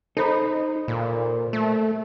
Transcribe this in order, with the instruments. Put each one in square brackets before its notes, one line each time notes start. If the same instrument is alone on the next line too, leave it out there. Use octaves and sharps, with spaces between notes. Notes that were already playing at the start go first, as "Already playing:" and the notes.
[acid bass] D#4 [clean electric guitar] A4 C5 B5
[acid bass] A#2
A3